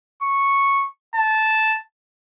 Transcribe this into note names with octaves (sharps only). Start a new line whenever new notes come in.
C#6
A5